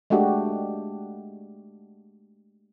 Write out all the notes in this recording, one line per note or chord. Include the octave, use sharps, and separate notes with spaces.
G#3 A3 D4 F#4 G4